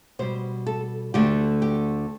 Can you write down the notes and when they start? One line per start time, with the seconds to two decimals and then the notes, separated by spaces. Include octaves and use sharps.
0.19 B2 G3 C5
0.67 A4
1.14 D2 D3 A3 G4
1.62 G4